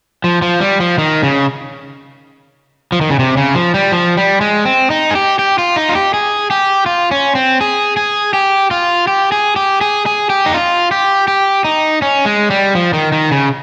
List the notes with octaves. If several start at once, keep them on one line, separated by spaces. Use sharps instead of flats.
F3
F3
G3
F3
D#3
C#3
F3
D#3
C#3
C3
C#3
F3
G3
F3
G3
G#3
C4
D#4
G#4
G4
G4
F4
D#4
F4
G4
G#4
G4
F4
C#4
C4
G#4
G#4
G4
F4
G4
G#4
G4
G#4
G#4
G4
D#4
F4
G4
G4
D#4
C#4
G#3
G3
F3
D#3
D#3
C#3